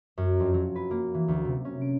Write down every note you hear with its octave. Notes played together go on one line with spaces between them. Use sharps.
F#2
F2
F#3
B4
A#3
E3
D2
C3
C#4
D7